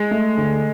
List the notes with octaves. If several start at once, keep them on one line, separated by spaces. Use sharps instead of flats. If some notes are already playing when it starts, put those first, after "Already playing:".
Already playing: G#3 G#4
A3
D3